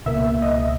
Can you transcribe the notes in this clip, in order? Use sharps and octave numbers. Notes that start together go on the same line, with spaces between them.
C#2 B2 A#3 E5
D#5